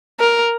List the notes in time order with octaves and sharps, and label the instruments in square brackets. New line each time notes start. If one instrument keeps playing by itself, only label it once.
[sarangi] A#4